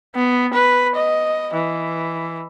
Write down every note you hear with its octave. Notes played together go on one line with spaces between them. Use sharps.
B3
B4
D#5
E3